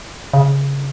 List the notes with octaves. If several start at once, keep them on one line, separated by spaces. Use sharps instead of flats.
C#3